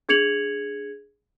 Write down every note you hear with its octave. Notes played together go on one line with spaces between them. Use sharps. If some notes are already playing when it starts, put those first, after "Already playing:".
D4 G#4 G#6 C#7 F7 F#7